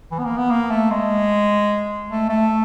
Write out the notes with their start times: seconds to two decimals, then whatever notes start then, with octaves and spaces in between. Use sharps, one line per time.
0.12 E3
0.19 B3
0.25 A#3
0.38 B3
0.51 A#3
0.71 A3
0.91 G#3
2.10 A3
2.29 A3